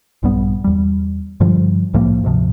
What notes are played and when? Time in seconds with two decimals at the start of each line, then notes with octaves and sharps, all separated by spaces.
0.23 A#1 G2 G3 B3
0.64 E2 G3
1.40 G2 D3 F3 G3
1.94 C2 A2 F3 A#3
2.23 D2 G#2 C3 F3